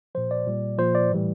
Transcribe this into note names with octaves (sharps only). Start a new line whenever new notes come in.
A#2 F3 C5
D5
A#2 G3
A#2 F3 C5
D5
A2 E3 G3